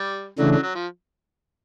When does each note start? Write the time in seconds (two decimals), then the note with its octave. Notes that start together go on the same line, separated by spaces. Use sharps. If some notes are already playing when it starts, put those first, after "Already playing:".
Already playing: G3
0.39 C#3 E3 F#3 A3 D4
0.51 F#3
0.63 F#3
0.75 F3